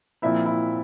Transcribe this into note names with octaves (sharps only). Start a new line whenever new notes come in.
A#2 F3 C4 E4 E5
E4 E5